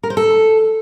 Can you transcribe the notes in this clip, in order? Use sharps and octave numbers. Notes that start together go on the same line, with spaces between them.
A#4
C5
A4